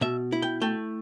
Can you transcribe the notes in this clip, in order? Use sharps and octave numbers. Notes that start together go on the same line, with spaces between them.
B2 E5
E4
G5
A3 G5